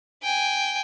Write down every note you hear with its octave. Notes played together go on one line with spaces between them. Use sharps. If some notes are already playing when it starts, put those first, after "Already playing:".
G5 G#5